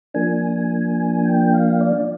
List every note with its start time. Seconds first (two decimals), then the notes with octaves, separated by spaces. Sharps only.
0.14 F3 A#3 D4 G#5
1.25 G5
1.53 F5
1.81 D5